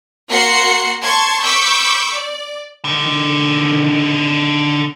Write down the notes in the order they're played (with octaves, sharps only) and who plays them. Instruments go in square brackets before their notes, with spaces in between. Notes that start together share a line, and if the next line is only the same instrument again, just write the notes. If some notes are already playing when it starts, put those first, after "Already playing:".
[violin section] A#3 F#4 F#5 C6 C7 C#7
A5 C6 C#6 G#6
B5 C#6 D6 E6 G6
D5
[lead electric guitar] D3 D#3